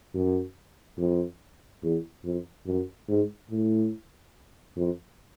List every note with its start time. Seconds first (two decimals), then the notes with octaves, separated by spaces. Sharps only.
0.15 F#2
0.99 F2
1.82 E2
2.25 F2
2.66 F#2
3.08 G#2
3.50 A2
4.77 F2